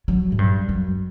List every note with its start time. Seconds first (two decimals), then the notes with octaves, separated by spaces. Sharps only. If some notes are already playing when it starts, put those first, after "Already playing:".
0.08 F#3
0.32 A2
0.39 G2
0.69 F#2